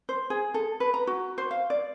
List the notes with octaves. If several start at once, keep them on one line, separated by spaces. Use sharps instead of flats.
C5
G#4
A4
B4
A#5
F#4
C5
F5
D5